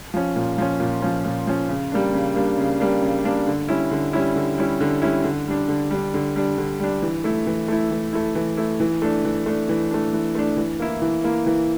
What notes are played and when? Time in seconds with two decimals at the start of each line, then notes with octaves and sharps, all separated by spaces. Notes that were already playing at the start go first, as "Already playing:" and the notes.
0.14 F3 C#4
0.36 A#2
0.58 F3 C#4
0.80 A#2
1.02 F3 C#4
1.25 A#2
1.47 F3 C#4
1.69 C#3
1.92 G3 A#3 D4
2.14 C#3
2.36 G3 A#3 D4
2.58 C#3
2.80 G3 A#3 D4
3.02 C#3
3.24 G3 A#3 D4
3.47 D3
3.69 G3 C#4 E4
3.91 D3
4.13 G3 C#4 E4
4.36 D3
4.58 G3 C#4 E4
4.81 D3
5.02 G3 C#4 E4
5.24 D3
5.47 G3 D4
5.68 D3
5.91 G3 D4
6.14 D3
6.36 G3 D4
6.58 D3
6.80 G3 D4
7.02 E3
7.24 A3 E4
7.47 E3
7.68 A3 E4
7.91 E3
8.13 A3 E4
8.35 E3
8.57 A3 E4
8.80 E3
9.02 A3 D4
9.25 E3
9.46 A3 D4
9.69 E3
9.91 A3 D4
10.13 E3
10.35 A3 D4
10.57 E3
10.80 A#3 E4
11.02 E3
11.24 A#3 E4
11.46 E3